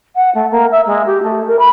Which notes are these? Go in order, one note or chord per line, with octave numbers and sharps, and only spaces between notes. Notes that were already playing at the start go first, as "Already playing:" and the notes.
F#5
A3
A#3
E5
G#3
G4
A3
A#4
B5